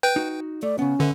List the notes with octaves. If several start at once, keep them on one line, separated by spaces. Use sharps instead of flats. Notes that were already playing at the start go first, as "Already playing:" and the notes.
B4 G5 G6
D#4 F#4
A3 D5
C#3 B3 C#4
D3 B4 E5